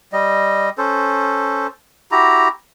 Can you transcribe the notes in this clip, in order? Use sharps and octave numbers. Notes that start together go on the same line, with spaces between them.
G3 D#5
C#4 A4 C5
E4 F#4 G4 A#5